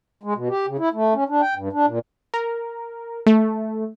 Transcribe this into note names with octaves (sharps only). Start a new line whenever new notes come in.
G#3
B2
G4
C#3
E4
A3
C#4
D4
G5
G2
D4
A#2
A#4
A3